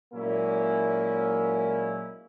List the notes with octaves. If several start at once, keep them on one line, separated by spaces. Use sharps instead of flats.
A#2 F#3 G#3 A#3 C#4 E4